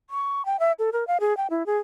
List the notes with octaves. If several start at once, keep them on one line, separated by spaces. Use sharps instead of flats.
C#6
G5
E5
A4
A#4
F5
G#4
G5
E4
G#4